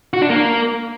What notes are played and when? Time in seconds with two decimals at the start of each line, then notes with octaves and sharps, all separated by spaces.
0.13 F#4
0.22 D4
0.30 A#3